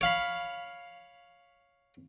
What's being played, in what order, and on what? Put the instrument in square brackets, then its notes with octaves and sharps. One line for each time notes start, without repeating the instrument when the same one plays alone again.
[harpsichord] C#5 F5 B5